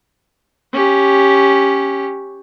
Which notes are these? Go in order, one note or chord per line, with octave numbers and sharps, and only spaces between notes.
C#4 G4